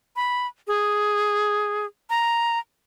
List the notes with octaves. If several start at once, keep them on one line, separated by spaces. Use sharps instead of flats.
B5
G#4
A#5